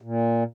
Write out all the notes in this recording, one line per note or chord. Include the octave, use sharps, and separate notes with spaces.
A#2